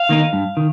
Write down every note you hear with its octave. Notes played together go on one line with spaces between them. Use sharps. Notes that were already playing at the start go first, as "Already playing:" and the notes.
Already playing: F5
D#3 A#3 D#4
G2
D#3